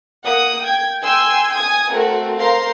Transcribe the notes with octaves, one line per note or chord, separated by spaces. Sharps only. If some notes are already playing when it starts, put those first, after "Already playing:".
A#3 F#5 D#6
G5 G#6
G5 G#5 C6 E6
G#5 D#6 G#6
A3 C4 F#4 A#4
A#4 C5 F5 A#5 C6